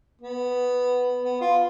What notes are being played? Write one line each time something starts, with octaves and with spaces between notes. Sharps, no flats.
B3
B3
F4